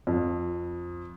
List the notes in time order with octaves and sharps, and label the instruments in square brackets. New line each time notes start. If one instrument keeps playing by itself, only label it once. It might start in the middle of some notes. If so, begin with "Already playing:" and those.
[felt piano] F2